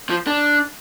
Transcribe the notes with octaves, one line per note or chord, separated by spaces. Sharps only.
F3
D4